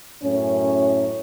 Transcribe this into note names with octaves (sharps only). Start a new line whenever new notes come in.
F#2 A2 C#4